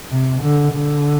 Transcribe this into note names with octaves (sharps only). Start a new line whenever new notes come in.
C3
D3
D3